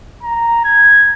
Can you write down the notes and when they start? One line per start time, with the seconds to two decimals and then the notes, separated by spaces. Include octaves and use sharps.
0.23 A#5
0.65 G#6